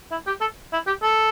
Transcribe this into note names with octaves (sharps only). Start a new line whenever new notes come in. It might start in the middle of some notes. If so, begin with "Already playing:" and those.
E4
G4
A4
E4
G4
A4